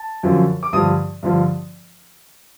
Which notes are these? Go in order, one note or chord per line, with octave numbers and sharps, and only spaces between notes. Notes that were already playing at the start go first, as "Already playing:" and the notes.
Already playing: A5
F#2 D3 F3
D6
G2 D3 F3 D#6
G2 D3 F3